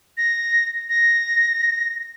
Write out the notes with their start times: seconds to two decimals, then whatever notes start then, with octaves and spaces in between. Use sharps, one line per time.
0.17 A#6
0.89 A#6